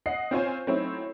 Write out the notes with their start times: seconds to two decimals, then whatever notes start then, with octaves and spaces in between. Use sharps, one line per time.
0.06 D#5 F#5 C7
0.31 C4 C#4 F4 C5 C#5 G#5
0.67 F#3 A3 C4 C#4 D#4 E4